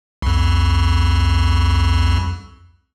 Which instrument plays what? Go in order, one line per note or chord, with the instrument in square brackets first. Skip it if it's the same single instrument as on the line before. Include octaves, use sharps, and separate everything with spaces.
[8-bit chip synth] C2 F2